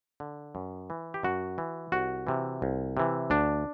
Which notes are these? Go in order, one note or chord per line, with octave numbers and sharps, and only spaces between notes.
D3
F#2
E3
G4
F#2 F#4
E3
C2 F#4
C3 E3
C2
C3 E3
D2 D4